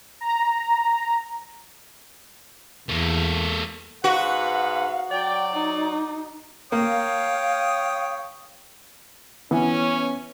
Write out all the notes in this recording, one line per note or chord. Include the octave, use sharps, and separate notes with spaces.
A#5
E2 A#3 A4
G#2 F#4 B4 F5 F#5
F#3 D5 G5
D#4
A#3 C#5 F5 G5 D#6
E3 B3 C#4